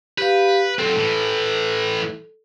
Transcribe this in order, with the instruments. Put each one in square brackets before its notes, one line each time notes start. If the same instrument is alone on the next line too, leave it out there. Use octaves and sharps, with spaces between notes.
[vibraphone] G4 F5 [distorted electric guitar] B4
[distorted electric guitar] F#3 C4 [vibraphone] A4
[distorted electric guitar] A2 E3